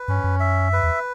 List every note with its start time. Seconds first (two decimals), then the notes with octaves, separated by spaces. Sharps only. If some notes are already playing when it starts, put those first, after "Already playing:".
Already playing: B4
0.08 G2 C#4
0.24 F#2
0.40 E5
0.73 B4
0.83 E2